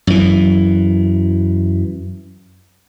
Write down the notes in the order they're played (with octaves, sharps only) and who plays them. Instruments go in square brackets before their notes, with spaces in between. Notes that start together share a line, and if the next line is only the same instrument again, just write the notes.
[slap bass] F#2 E3